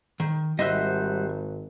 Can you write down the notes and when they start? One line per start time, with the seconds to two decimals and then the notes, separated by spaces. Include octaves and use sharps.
0.20 D#3
0.59 G#1 G3 C5 D#5 E5 F#5